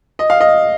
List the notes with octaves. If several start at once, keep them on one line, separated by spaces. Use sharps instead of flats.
D#5
F5
D#5